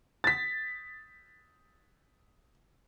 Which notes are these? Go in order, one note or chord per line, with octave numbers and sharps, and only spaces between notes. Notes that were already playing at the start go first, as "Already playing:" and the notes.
A6 B6